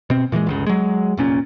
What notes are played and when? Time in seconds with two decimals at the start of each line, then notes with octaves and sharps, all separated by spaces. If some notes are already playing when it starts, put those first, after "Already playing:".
0.10 B2 C4
0.32 A#2 E3 F3 G#3
0.47 G1 C#2 C#3
0.67 F#3 G#3
1.17 F1 A#2 C#4